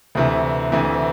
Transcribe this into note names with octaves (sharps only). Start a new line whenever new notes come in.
D2 C3 E3
D2 C3 E3